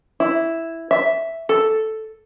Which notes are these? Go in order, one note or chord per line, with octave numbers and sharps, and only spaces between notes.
E4
E5
A4